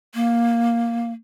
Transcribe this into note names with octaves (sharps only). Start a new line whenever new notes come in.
A#3